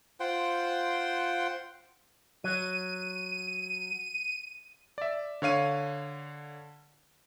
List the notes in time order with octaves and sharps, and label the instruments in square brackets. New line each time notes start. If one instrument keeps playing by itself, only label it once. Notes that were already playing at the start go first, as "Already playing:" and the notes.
[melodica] F4 C5 F#5 G5
[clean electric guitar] F#3 [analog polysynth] D#7
[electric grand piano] D5 E5
D3 C#5 F5 D#7